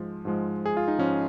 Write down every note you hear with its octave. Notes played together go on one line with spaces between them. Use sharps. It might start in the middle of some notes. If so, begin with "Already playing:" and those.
Already playing: G#2 F3 G#3
G#2 F3 G#3
G#4
F4
D#4
G#2 F3 G#3 C#4